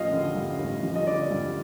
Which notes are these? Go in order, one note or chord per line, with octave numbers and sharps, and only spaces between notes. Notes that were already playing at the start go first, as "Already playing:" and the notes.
Already playing: A1 F3 D#5 F5
D3
G2
A1
F3
D#5
D3 D5
G2